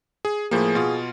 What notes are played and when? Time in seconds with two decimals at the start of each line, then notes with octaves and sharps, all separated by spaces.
0.25 G#4
0.51 A2 F3 A#3 G#4
0.75 B2 F4